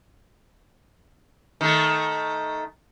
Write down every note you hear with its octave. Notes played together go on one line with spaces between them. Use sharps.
D#3 A3